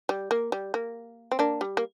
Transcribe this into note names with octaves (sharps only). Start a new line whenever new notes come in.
G3
A#3
G3
A#3
C4
A#3 D4
G3
A#3